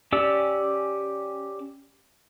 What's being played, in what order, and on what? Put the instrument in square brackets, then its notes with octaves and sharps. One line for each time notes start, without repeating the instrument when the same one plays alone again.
[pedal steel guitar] C#4 G4 D5 E6